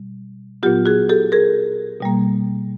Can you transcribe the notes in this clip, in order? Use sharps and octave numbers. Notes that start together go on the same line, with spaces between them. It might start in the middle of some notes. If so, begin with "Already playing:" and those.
Already playing: B2 G3
A#2 F#3 B3 F4 G4
F#4 G#4
G4 A4
G#4 A#4
B2 G3 A#3